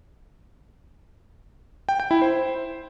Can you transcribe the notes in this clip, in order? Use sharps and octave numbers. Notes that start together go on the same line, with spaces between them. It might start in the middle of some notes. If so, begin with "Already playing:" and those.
G5
G5
E4
C5